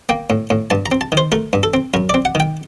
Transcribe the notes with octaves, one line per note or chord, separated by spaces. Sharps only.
A#3 G5
A2
A2
G2 A5
A#5
C4
A5
D#3
C5
A3 A#4
G2
A4
C4
F#2 A#4
C4 D5
F#5
D#3 G5